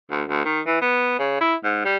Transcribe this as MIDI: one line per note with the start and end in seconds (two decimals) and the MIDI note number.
0.11 0.24 38
0.29 0.42 38
0.45 0.60 51
0.66 0.80 52
0.81 1.15 59
1.19 1.36 49
1.41 1.55 64
1.64 1.81 44
1.85 1.97 55